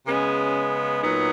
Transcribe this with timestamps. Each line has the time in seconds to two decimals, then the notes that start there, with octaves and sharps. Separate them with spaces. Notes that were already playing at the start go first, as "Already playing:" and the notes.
0.07 C#3 G#3 B3 C#4
1.02 A#2 F#3 B3 D#4